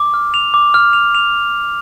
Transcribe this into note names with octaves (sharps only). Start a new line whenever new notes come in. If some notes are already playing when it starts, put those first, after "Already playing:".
Already playing: D6
F6
F7
D6
F6
F7
F7